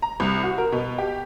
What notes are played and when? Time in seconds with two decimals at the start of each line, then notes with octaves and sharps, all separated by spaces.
0.02 A#5
0.20 C2
0.43 F#4
0.58 A#4
0.72 B2
0.98 G4